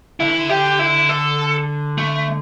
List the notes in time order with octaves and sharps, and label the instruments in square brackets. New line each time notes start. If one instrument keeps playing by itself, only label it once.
[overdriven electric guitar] D3 [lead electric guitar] E4
[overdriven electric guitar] E3
D3
[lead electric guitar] G4
E4
A4
A3